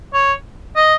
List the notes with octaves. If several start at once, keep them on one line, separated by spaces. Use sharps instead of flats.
C#5
D#5